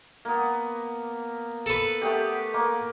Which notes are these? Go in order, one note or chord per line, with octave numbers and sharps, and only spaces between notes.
A#3 B3
A4 B4
A3 B3 G4
A#3 D6